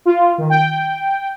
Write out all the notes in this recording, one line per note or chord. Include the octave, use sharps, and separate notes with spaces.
F4
D#3
G5